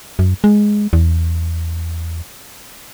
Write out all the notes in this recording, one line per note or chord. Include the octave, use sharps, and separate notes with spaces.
F#2
G#3
E2